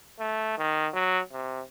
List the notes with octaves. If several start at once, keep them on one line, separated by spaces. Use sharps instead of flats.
A3
D#3
F#3
C3